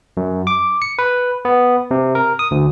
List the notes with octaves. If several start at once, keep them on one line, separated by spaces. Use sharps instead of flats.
F#2
D6
C#7
B4
B3
C3
A#4
D#6
D2